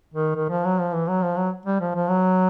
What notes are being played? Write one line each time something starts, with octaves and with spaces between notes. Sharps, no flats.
D#3
D#3
F3
F#3
F3
E3
F#3
F3
F#3
G3
F3
F3
F#3